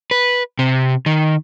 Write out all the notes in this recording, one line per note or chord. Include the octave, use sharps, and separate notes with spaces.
B4
C3
D#3